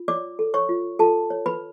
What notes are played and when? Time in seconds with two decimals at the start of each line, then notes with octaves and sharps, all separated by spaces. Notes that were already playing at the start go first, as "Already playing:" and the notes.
Already playing: F4
0.08 C#5 D5 D6
0.39 A4
0.54 C#5 C#6
0.69 F4
0.99 F4 A4 A5
1.30 C#5
1.46 B4 B5